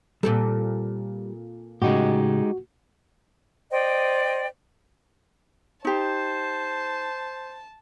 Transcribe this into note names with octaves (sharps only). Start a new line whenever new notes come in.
A#2 G3 C4 A4
A2 C#3 G#3 D#4 F#4 G4
C5 D5 D#5 G5
D#4 G4 C5 A5